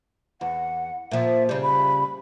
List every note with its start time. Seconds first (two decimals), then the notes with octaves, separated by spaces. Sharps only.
0.41 E2 F#5
1.11 A#2 F3 E5
1.49 C#3 G3 C5
1.63 B5